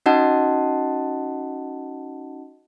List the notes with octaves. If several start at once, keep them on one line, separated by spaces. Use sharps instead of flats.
C#4 D#4 F#4 D#5 F#5 A5